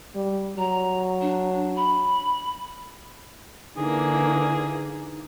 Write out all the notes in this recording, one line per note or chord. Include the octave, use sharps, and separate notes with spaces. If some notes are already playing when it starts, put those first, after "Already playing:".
G3
F#3 A#5
D4
B5
D3 E3 A#3 D#4 G#4